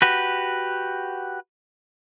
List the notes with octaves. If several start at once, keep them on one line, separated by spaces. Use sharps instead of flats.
F#4 G4 B4